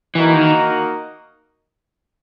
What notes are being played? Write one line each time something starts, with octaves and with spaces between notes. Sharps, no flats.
E3 A#3 D#4 F#4 A#4 D#5
D#3